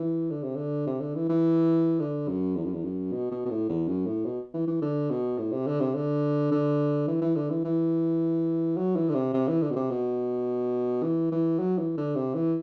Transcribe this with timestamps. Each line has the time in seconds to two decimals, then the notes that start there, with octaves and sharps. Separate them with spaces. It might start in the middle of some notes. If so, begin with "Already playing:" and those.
Already playing: E3
0.31 D3
0.44 C3
0.56 D3
0.87 C3
1.01 D3
1.15 E3
1.29 E3
2.00 D3
2.29 F#2
2.56 E2
2.65 F#2
2.74 E2
2.84 F#2
3.13 B2
3.32 B2
3.46 B2
3.51 A2
3.69 E2
3.88 F#2
4.07 A2
4.26 B2
4.54 E3
4.68 E3
4.82 D3
5.10 B2
5.39 A2
5.52 C3
5.67 D3
5.81 C3
5.95 D3
6.52 D3
7.08 E3
7.22 E3
7.36 D3
7.50 E3
7.65 E3
8.77 F#3
8.96 E3
9.09 D3
9.15 C3
9.34 C3
9.48 E3
9.62 D3
9.71 B2
9.76 C3
9.91 B2
11.03 E3
11.32 E3
11.59 F#3
11.78 E3
11.97 D3
12.16 C3
12.35 E3